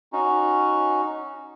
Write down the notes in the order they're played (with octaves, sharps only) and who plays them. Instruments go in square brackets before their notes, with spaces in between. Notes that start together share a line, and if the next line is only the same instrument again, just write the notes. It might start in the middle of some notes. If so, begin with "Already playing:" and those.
[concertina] C#4 D#4 F#4